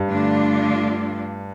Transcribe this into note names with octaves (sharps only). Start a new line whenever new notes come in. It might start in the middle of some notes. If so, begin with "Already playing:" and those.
Already playing: G2
D3 A3 D4 F4